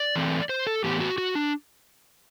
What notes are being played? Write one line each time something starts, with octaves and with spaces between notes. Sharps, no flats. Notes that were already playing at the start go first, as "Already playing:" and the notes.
Already playing: D5
E3 A3 C4
C5
A4
A2 E3 B3 G4
F#4
F#4
D4